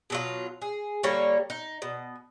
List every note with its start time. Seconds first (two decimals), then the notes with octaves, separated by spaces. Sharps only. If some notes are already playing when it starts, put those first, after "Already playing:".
0.10 B2 F#3 F4
0.62 G#4
1.03 D3 G3 A#3 C#5
1.50 D#4
1.82 B2